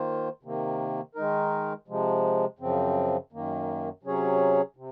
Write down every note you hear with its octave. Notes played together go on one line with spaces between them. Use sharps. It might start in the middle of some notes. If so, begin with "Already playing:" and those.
Already playing: D#3 A#3 F4 C5
C3 D#3 A#3
D#3 G#3 D#4 A#4
C3 F3 G#3
F#2 C#3 F3 C4
F#2 D#3 A#3
C3 F#3 C#4 G#4 C#5
C3